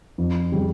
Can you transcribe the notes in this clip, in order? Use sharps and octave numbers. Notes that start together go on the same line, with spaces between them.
F2
C#3 G3